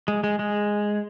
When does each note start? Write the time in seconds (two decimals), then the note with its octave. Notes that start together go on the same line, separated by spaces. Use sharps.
0.08 G#3
0.24 G#3
0.39 G#3